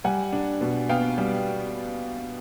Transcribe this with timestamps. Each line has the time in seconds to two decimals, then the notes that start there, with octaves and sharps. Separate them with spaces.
0.04 G3 F#5 G#5
0.32 D4
0.61 B2
0.89 B3 F5 G5
1.18 G3